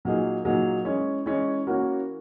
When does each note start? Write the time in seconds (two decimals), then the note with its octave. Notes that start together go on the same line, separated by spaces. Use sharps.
0.05 A#2 F#3 A#3 D#4 G#4
0.45 A#2 F#3 A#3 D#4 G#4
0.85 E3 G#3 C#4
1.26 E3 G#3 C#4
1.67 E3 A#3 C#4 F#4 A#4